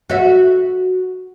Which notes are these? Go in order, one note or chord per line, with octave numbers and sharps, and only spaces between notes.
F#4 E5